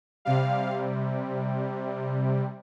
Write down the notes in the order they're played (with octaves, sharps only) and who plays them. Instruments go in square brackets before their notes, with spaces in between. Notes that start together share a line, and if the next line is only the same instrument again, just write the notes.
[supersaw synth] C3 G3 F5